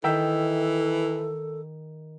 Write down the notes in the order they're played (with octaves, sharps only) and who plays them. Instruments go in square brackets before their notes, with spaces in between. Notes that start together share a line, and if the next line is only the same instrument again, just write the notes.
[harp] D#3 E5 G5 [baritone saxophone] E3 [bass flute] A4